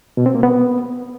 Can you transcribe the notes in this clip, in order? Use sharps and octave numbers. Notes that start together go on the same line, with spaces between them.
B2
C4
A#3
B3